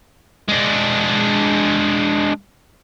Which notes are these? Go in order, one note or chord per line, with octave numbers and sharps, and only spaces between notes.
G#3 D4